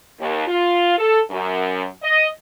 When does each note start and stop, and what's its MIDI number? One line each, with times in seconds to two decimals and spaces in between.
0.19 0.45 39
0.47 0.98 65
0.98 1.20 69
1.30 1.87 42
2.03 2.26 75